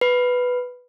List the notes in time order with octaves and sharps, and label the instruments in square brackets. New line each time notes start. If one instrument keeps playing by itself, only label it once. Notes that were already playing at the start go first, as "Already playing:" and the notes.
[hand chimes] B4